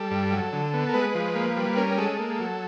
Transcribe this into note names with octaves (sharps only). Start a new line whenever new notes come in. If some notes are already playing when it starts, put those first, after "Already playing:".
Already playing: G3 A4
G2
F#3
D3
B3
A#4
G#3 B4
F3
A#3
G3
C#4 A#4
G#3 A4
A#3
F#3